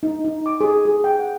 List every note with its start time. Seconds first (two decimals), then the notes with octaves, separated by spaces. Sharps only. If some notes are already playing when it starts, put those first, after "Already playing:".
0.03 D#4
0.25 D#4
0.46 D6
0.61 G#4
0.85 G#4
1.04 G5
1.19 F#5